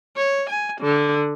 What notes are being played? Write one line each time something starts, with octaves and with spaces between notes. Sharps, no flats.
C#5
G#5
D3